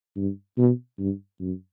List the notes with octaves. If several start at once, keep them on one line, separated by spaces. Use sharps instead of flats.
G2
B2
G2
F#2